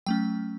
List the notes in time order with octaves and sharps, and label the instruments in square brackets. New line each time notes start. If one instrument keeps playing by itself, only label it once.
[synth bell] F#3 A3 C#4 G5